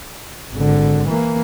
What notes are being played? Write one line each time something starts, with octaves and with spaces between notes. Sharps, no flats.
G#1 D3
E3 A#3